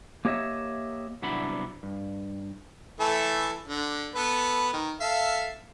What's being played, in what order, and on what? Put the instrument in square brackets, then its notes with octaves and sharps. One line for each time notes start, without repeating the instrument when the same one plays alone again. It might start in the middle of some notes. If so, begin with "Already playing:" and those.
[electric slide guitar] A#3 G4 C#5 D#5 E5
[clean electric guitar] C2 F#3 B3 D4 E4 B5
G2
[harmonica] E3 A3 A4
D3
B3 A4 B4
D#3
A4 E5 F5